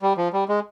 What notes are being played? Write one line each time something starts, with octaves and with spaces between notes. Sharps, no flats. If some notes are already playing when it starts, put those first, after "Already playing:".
G3
F3
G3
G#3